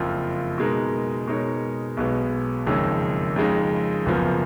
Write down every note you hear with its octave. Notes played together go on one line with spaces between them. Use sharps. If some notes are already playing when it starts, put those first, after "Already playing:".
Already playing: F#1 F2 F3
B2 G#3 D#4 A#4
B2 G#3 D#4 A#4 C#5
B1 B2 G#3 B3
F#1 F2 D#3 G#3 C#4
F2 C#3 G#3 D#4
F#1 F#2 F3 B3